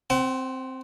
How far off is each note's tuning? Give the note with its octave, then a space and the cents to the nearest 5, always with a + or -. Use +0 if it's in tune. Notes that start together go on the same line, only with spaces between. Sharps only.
C4 +0 F#5 +45